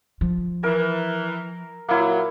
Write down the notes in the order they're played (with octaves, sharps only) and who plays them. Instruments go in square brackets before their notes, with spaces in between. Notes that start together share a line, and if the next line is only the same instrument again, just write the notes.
[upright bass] F3
[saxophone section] E3 [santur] A#4
[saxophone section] A#2 F#3 [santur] A#3 E4